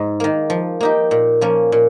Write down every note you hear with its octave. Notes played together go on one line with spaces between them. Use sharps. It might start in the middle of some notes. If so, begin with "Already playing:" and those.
Already playing: G#2
D#3 A#3
F3
A#3 D#4 G4
A#2
F3 A#3 C#4
A#2